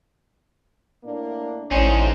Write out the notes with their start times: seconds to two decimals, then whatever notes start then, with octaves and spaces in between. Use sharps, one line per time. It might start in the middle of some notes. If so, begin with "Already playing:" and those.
1.04 A2 A#3 D4
1.71 A1 A2 C#4 D#4 C5 D5